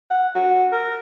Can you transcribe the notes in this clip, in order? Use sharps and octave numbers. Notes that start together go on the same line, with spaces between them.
F#5
F#4
A#4